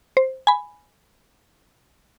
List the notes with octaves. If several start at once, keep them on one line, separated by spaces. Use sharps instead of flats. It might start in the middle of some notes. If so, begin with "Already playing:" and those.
C5
G#5 B5